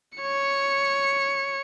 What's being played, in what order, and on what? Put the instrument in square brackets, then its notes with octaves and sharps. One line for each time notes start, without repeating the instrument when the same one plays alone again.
[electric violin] C#5 C#7